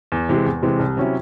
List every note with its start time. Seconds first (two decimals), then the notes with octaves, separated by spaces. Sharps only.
0.12 E2
0.29 C3 E3 G#3
0.46 E2
0.63 C3 E3 G#3
0.79 C2
0.97 C3 F#3 C#4 E4